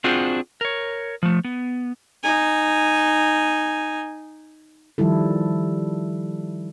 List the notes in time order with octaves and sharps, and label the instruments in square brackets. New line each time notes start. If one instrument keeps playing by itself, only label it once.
[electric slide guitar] C4 D4 F4 F#4 G#4 C5
A#4 C#5
F3 A3
B3
[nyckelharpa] D#4 G#5
[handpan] D#3 F3 G3 E4 A4